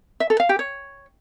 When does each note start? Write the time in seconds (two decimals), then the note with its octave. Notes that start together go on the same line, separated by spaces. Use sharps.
0.20 E5
0.30 A4
0.40 F5
0.49 G4
0.59 C#5